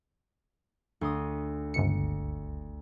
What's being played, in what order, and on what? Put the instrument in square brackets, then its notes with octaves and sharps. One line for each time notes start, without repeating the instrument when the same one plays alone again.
[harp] D2 C6 D#6
[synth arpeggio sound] G1 C#2 C#7